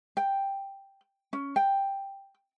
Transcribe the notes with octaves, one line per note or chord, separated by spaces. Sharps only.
G5
C#4
G5